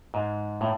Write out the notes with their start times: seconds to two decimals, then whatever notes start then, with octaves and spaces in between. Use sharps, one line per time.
0.14 G#2
0.61 A2